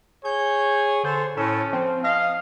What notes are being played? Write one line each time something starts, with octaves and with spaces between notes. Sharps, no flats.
G#4 C#5 G6
D3 C5
A2 C#4 A4
F3 C4
D#5 F5